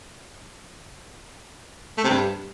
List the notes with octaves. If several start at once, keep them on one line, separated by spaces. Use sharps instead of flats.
A3
C3
G2